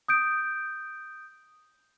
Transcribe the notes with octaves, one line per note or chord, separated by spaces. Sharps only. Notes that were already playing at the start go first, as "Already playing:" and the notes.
D#6 G6 D7